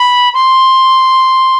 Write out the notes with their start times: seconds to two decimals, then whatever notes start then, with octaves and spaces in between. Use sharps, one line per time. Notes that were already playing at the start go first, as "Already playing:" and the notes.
Already playing: B5
0.34 C6